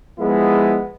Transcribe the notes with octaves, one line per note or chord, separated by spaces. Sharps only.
F3 G#3 B3 E4